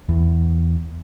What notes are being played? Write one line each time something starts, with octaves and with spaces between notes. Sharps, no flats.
E2